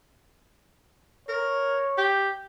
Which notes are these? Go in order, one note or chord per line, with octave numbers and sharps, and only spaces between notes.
A#4 C#5
G4